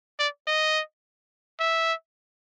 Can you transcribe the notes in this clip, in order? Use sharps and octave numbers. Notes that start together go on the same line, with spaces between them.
D5
D#5
E5